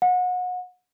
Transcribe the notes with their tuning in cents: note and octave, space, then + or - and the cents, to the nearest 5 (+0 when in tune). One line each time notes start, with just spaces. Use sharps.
F#5 -30